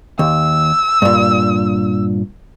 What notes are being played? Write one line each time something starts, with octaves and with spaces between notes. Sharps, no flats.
D#2 E6
G2 A#2